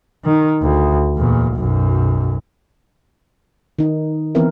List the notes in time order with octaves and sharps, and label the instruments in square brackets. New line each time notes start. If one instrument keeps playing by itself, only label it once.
[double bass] D#3
D2
E2 A#2
B1 F#2
[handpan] D#3 D#4
E3 B3 C4 E4 A#4 E5